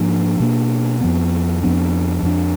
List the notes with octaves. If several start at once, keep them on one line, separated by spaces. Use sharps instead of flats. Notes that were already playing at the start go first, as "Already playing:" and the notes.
Already playing: G#2 F3 A#3 D4
B2 A#3 D4
F2 F3 B3
F2 F3 B3 D4
F2 F3 A#3 D4